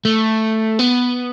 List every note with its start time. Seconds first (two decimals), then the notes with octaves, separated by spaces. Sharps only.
0.05 A3
0.79 B3